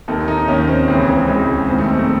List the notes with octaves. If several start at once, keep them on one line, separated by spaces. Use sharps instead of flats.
D#2 D#3 A4
D#4
D#2 D#3 C#4
C4
C#2 C#3 E3 C4
C#2 C#3 E3
E2 D#3 C4
A3
C4
A3